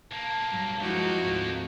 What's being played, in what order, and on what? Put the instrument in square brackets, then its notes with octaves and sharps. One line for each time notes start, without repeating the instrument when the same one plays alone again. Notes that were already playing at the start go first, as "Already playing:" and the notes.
[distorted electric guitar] B1 A#3 [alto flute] A5
[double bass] G2 F#3
[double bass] F#1 E4 [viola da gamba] F3 D#4 F#4 [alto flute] G#3 [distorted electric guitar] A#3 G4
[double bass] D2 G#2 [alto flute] C4